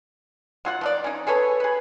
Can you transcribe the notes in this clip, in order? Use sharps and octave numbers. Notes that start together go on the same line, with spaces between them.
F#3 F4 F#5
F3 D#4 D5
C#4 D#4
G#4 A4 B4 C#5
G#4 B4